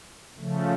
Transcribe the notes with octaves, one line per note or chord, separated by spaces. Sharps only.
C#3 F3 A3